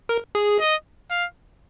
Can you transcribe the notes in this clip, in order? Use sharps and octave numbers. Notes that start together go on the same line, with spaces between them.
A#4
G#4
D#5
F5